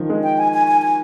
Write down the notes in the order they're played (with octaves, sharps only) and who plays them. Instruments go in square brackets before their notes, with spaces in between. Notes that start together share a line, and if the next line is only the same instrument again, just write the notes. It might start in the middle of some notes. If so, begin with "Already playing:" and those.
Already playing: [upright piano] D#3 F3
G#3
[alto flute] G5
G#5
G#5
G#5
G#5